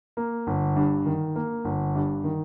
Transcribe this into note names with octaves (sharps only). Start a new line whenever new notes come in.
A#3
G1
G2
D#3
A#3
G1
G2
D#3